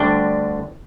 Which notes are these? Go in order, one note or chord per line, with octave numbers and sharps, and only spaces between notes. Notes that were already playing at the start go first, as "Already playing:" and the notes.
Already playing: D2 D3 G3 D4 G5